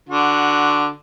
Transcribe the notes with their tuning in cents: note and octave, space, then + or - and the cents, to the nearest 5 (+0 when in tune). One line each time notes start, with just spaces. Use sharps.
D3 +0 F#4 +0